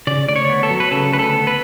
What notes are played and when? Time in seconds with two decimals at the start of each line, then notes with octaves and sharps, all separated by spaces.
0.07 C#3 D5
0.28 D2 D5
0.36 C#5
0.49 B3
0.63 A4
0.70 F#3
0.80 B4
0.91 C#3 A4
1.12 D2 B4
1.19 A4
1.33 B3
1.47 B4